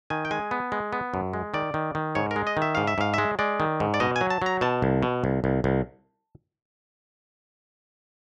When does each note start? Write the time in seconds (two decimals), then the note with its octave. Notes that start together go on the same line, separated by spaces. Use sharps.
0.10 D#3 G#5
0.25 G5
0.31 G#3 G#5
0.51 B3
0.72 G#3
0.93 B3
1.14 F#2
1.33 G#3
1.54 D#3 D5
1.74 D#3
1.95 D#3
2.15 G#2 C#5
2.31 A#4
2.36 G#3
2.47 D#5
2.57 D#3
2.62 E5
2.75 G#2 F5
2.87 E5
2.98 G#2 F5
3.14 G#3 E5
3.39 G#3 D5
3.60 D#3
3.80 G#2
3.94 D5
4.00 B2 D#5
4.16 G#5
4.21 F#3
4.30 A5
4.42 F#3 A#5
4.61 B2 A5
4.82 C2
5.03 B2
5.24 C2
5.44 C2
5.64 C2